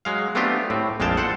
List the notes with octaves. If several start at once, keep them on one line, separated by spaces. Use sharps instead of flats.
F#3 G#3 F5
A3 B3 C4 D4 F4 G4
A2 C4
A#1 F2 G#3 F5 G5 A5
A4 C5 F#5